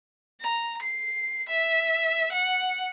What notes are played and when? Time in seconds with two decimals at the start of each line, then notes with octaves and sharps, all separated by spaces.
0.41 A#5
0.82 C7
1.49 E5
2.32 F#5